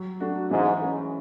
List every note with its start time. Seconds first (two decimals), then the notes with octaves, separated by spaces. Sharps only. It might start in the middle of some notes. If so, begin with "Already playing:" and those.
Already playing: F#3
0.20 A3 D4 F#4
0.51 G#2 E3
0.82 G#3 C#4